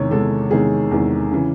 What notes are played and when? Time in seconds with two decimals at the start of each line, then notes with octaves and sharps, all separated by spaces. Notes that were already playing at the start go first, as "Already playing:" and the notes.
Already playing: E2 C3 D#3 G#3 C#5
0.11 E2 C3 D#3 G#3 A4
0.51 E2 C3 D#3 G#3 G#4
0.91 E2 C3 D#3 G#3
1.31 C#3 E3